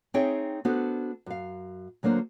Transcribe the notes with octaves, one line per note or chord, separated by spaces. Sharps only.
C4 D#4 G#4 C#5 E5 G5
B3 D4 F#4 A4 C5
F#2 F5
D2 F#3 A#3 D4 C5